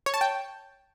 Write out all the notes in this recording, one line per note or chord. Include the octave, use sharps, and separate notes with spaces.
C#5
A5
G5